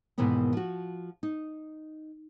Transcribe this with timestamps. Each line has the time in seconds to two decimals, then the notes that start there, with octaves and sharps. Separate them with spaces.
0.18 D#2 G#2 B2 E3 A#3 B3
0.53 F3 F#4
1.23 D#4